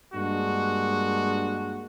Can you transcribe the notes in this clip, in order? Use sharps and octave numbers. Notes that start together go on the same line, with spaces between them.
G2 G#3 A#3 D4 F#4